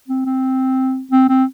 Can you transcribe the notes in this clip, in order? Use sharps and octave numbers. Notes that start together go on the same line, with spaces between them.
C4
C4
C4
C4